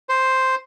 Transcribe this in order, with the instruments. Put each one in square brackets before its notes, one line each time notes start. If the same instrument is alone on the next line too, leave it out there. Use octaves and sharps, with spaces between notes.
[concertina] C5